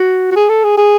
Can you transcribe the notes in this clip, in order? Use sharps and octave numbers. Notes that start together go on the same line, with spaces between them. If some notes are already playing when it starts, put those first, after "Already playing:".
Already playing: F#4
F#4
G#4
A4
G#4
G#4